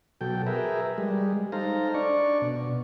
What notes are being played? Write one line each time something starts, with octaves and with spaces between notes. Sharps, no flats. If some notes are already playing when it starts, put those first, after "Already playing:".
B2 F#3 A4 G5
G#4 A#4 B4 E5
G3 G#3
D#4 A4 C5 F5 A#5
D4 D5 C#6
B2